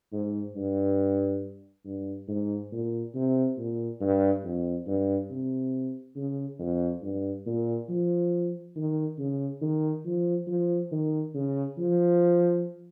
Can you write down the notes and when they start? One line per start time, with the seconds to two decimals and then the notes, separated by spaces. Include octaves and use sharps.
0.12 G#2
0.56 G2
1.85 G2
2.28 G#2
2.72 A#2
3.15 C3
3.58 A#2
4.01 G2
4.45 F2
4.87 G2
5.30 C3
6.16 C#3
6.59 F2
7.02 G2
7.46 A#2
7.89 F3
8.76 D#3
9.18 C#3
9.61 D#3
10.05 F3
10.47 F3
10.92 D#3
11.35 C#3
11.78 F3